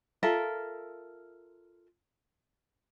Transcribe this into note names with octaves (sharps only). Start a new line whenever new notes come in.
F4 A4 A#4 E5